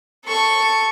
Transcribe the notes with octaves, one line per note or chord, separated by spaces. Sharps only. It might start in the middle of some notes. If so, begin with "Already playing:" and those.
A4 C#6